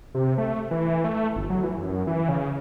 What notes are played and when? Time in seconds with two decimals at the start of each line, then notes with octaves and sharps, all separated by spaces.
0.15 C3
0.38 A3
0.71 E3
1.04 A3
1.36 G1
1.50 F#3
1.63 E3
1.77 F#2
2.07 E3
2.29 C#3